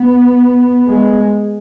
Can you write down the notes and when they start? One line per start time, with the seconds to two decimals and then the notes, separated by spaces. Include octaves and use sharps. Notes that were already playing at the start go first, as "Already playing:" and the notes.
Already playing: B3
0.88 G#3